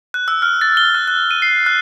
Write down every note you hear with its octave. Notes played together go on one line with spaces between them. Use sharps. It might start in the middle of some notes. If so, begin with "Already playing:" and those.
F#6
E6
F6
A6
G7
F#6
F#6
D#7
C7
F#6